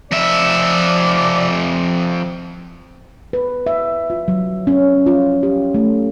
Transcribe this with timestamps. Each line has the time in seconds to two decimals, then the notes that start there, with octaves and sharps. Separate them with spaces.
0.11 F2 D5 E5
3.33 B4
3.66 E5
4.10 F4
4.28 F#3
4.67 C#4
5.06 F4
5.43 G4
5.74 A3